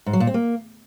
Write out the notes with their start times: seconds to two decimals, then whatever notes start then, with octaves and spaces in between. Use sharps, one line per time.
0.06 G#2
0.13 F#3
0.20 A#2
0.27 C4
0.34 A#3